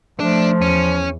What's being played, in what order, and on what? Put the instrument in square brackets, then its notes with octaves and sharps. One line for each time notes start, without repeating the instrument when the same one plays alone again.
[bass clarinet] F3 [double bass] A3 [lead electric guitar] D4
[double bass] E2 [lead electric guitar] C#4